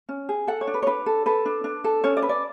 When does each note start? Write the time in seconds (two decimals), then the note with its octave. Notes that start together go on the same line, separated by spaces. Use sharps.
0.09 C#4
0.29 G#4
0.47 A4 F#5
0.61 C#5
0.67 D4
0.74 B4
0.82 C#5
0.87 D4 B4
1.06 A4
1.26 A4 B4
1.45 D4
1.64 D4
1.84 A4
2.04 C#4 C#5
2.17 D5
2.22 B4
2.29 D5